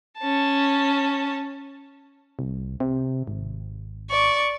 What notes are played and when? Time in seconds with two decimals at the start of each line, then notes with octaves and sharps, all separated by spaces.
0.19 C#4 A5
2.39 C2
2.80 C3
3.27 G#1
4.10 D5 C#6